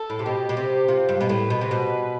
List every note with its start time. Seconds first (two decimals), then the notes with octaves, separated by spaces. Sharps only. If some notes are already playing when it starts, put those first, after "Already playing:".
Already playing: A4
0.10 A2
0.19 C3
0.26 B2 G4
0.49 B2
0.57 C3
0.88 C3 F4
1.09 G2
1.20 B2 B4
1.29 A2
1.50 B2
1.61 C3
1.71 B2